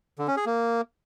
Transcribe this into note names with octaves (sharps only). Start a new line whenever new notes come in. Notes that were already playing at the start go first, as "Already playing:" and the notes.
D3
C#4
G#4
A#3